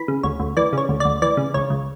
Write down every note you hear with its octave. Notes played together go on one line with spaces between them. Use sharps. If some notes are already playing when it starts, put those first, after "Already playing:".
Already playing: E3 B5
C#3
D2 C#5
D2
E3 D5
C#3 C#5
D2
D2 D5
E3 D5
C#3
C#2 C#5
C#2